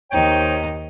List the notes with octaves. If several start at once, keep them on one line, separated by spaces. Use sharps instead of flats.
D#2 D#4 C5 C#5 G5